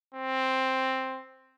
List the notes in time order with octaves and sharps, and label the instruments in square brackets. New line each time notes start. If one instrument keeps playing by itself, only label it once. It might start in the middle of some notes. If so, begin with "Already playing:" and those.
[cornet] C4